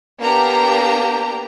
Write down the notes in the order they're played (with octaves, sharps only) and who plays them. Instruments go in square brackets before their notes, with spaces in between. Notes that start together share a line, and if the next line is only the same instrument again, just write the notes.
[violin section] A#3 B3 D4 G4 A#5